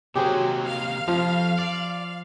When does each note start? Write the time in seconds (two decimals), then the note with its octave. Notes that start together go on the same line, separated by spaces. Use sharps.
0.16 C3 F#3 A#3 G4 G#4 C5
0.66 F5
1.08 F2 F3 F4
1.59 D5